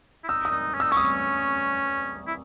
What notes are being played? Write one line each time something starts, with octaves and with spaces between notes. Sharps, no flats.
E4
D#4 E6
D#6
D#4
C#4
D#4 E6
C#4 C#6
D#6
E4